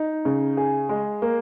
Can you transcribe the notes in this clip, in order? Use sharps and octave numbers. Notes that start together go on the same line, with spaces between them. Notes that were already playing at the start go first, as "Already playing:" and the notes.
Already playing: D#4
C#3
G#4
G#3
A#3